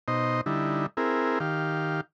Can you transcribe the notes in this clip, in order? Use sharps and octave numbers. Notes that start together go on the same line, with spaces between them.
B2 D#4 C5 D#5
D3 G3 D#4 E4
C4 E4 G#4 A#4
D#3 G4 F5